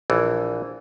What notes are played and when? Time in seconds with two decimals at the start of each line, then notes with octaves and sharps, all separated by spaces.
0.10 A#1 E3